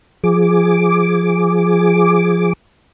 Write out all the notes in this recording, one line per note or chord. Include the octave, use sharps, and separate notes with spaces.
F3 G#4 D6